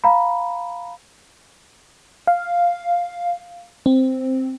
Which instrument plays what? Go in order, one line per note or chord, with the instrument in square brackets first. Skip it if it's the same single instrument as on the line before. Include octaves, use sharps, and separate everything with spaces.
[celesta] F5 A#5 B5
[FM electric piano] F5
C4